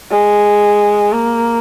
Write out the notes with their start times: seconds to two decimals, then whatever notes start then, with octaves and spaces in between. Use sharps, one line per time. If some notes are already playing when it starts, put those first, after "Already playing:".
0.11 G#3
1.12 A#3